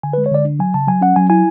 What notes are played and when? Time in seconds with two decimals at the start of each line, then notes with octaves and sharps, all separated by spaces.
0.03 D3 G#5
0.13 G#3 B4
0.26 C#5
0.31 D3 D5
0.45 D4
0.59 F#3 G#5
0.74 C#3 A5
0.88 F#3 G#5
1.01 C#4 F#5
1.16 F#3 G#5
1.30 E4 G#5